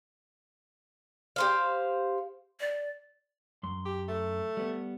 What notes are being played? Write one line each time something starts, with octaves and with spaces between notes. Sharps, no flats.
G4 C5 F5
D5
F#2 C6
G4
A3
G3 B3